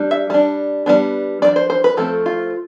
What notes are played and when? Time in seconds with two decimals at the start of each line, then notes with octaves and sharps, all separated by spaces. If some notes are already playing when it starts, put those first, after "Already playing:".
Already playing: G3 D4
0.11 E5
0.30 G3 D4
0.86 G3 B3 D4
1.42 F3 A3 D4 D5
1.56 C5
1.70 C5
1.84 B4
1.97 F3 A3 C4 A4
2.26 F4